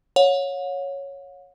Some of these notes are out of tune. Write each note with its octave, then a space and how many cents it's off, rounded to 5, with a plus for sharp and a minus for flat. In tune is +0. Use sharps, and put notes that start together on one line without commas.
C#5 +0 F#5 -45